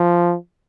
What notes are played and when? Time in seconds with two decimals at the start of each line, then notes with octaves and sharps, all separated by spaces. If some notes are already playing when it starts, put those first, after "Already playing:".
Already playing: F3